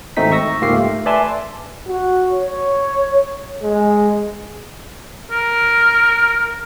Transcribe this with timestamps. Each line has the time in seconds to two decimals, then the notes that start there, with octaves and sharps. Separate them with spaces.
0.17 G#1 G#2 A3 C4 D#4 B6
0.32 C#6 E6 A#6
0.61 C#2 G#2 A#3 F4 G4 C7
0.73 A3
1.06 B4 D5 E5 G#5 A5 C6
1.87 F#4
2.32 C#5
3.63 G#3
5.31 A#4